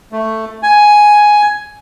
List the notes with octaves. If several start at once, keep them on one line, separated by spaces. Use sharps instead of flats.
A3
G#5